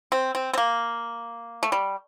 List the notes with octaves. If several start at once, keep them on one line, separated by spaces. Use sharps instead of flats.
C4
C4
C4
A#3
A3
G3